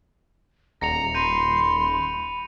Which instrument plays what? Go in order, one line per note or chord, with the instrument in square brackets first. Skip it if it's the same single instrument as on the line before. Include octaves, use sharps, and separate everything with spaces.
[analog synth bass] D#1 [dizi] A#5 [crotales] A#6 C#7 F7
[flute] B5 [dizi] C6 [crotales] G6 A#6 D#7